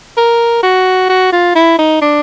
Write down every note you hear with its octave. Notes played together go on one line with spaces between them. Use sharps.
A#4
F#4
F#4
F4
E4
D#4
D4